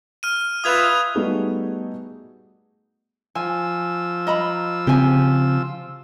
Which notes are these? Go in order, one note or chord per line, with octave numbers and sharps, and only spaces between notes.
F6 D#7
F4 B4 E5 D#6 G#6 F7
G3 A3 B3 D#4 F#4 G#4
F3 G#5 E6
D#5 A#5 B5
C#3 C4 G4 G#5